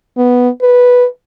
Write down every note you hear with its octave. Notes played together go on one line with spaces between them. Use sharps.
B3
B4